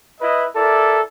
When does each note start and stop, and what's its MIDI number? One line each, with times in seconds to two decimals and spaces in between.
0.21 0.46 64
0.21 0.46 71
0.21 0.46 75
0.56 1.00 64
0.56 1.00 69
0.56 1.00 70
0.56 1.00 74